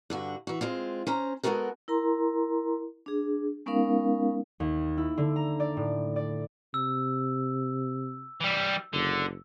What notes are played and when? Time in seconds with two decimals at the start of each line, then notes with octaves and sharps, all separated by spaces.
0.10 G2 D3 F#4
0.47 E3 F#4
0.61 G#3 C4 F4
1.07 C#4 C5 A#5
1.43 G#3 B3 C#4 F#4 A4 A#4
1.88 E4 A#4 A#5 C6
3.06 D4 G#4
3.66 G#3 B3 C#4 D#4 A#4 F5
4.60 D#2
4.97 E4
5.18 D3
5.36 A#5
5.60 D5
5.77 A2
6.16 D5
6.74 C3 E6
8.41 E3 G3
8.93 F#1 D3